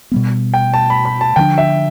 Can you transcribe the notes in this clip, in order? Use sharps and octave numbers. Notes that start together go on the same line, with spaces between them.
B2 G3 B3
G5
A5
B5
B5
A5
D3 F3 B3 D4 G5
E5